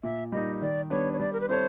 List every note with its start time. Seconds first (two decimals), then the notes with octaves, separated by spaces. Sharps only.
0.03 A#2 E5
0.32 G3 A#3 D#4 D#5
0.61 D#3 D5
0.90 G3 B3 D4 C#5
1.13 C#5
1.19 G3 D5
1.33 A#4
1.41 B4
1.49 C4 E4 A4 C5 C#5